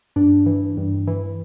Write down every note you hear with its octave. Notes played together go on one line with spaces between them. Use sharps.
G2 D4
E3
G2
E3